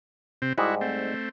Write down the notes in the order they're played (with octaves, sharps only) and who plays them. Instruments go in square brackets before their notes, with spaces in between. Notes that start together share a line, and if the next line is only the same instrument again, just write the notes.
[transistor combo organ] C3 C4
[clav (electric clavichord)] G#2 G3 D#5 [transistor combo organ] E4 F#4
[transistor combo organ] A3 C4